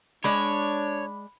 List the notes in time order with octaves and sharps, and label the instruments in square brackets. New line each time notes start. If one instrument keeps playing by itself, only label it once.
[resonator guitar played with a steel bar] G#3 D5 [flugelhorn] D4 [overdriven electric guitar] C#5 [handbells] B5